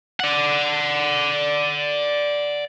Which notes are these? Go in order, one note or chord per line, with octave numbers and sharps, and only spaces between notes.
D5 F#5